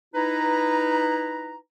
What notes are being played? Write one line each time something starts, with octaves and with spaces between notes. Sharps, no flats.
D#4 E4 B4 A#5